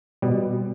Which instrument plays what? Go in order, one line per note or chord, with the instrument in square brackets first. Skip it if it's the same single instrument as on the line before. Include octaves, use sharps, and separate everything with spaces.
[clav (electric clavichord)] B2 G3 B3